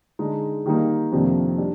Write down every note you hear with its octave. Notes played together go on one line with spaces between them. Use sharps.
D3 G#3 D#4
D#3 G3 A#3 D#4
F2 C3 D#3 A#3 D4
G3 D4